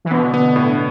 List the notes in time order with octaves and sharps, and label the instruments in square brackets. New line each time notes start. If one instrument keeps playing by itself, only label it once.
[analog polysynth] E3
[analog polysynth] B2 D3 [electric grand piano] B3
[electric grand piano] B3
A2